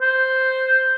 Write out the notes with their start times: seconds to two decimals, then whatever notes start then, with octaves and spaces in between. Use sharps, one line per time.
0.01 C5